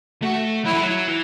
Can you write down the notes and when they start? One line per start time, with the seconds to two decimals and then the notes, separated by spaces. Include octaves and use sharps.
0.22 A3 F#4
0.65 F#3 E4
0.74 E3
0.82 F#3
1.08 E3